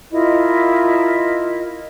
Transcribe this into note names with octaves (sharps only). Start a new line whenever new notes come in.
E4 F4 A#4 D#5